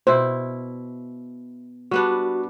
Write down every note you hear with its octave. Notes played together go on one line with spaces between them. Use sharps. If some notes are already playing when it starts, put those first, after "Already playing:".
B2 E4 C5
G3 B3 D4 F#4